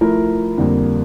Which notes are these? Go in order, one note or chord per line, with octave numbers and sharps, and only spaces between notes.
F3 A3 E4 A#4
F2 D3 G3 A#3